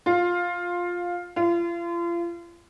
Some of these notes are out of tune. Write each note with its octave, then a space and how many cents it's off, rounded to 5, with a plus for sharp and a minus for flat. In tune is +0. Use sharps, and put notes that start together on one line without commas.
F4 +10
F4 -35